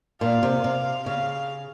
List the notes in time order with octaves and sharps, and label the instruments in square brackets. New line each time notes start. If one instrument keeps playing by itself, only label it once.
[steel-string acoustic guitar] A#2 [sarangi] F5
[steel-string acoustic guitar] C3
C3
[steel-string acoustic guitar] C#3 [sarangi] F5